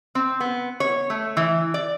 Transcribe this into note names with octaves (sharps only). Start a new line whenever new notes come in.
C4
B3
C#5
A3
E3
D5